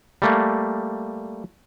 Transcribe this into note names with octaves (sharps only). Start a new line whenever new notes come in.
G3 A3 A#3